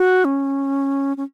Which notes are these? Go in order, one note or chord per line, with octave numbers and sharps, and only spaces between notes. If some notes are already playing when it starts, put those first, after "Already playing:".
Already playing: F#4
C#4
C#4